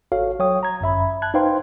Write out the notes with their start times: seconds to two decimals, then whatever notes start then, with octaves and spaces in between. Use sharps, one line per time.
0.12 G#1 F#4 A4 C#5 F5
0.39 F#3 C#5 G5 D#6
0.63 A#5 G#6
0.81 G1 F#2 E5 B5
1.22 A5 F#6 G#6
1.34 D#4 B4 C5 F5 G5 C6